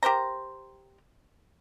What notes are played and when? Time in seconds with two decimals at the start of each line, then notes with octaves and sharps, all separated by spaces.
0.03 G4 A#4 C5 A#5